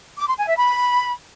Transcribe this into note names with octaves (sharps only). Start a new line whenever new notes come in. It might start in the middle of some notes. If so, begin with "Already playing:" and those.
D6
C6
G#5
E5
B5